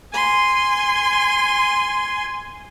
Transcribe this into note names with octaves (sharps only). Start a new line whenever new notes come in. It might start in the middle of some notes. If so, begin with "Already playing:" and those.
G#5 C6